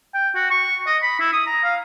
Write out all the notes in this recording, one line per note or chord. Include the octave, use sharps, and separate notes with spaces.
G5
F#4
C#6
D#5
B5
E4
D#6
A#5
F5